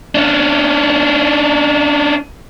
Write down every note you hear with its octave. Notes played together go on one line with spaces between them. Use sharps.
C#4 D4